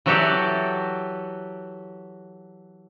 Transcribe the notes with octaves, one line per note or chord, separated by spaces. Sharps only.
E3 F#3 F#4 G4 A4 D5